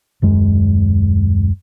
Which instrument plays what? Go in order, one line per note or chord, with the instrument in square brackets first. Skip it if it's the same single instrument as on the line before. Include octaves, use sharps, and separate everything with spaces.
[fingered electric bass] D#1 F#2 G#3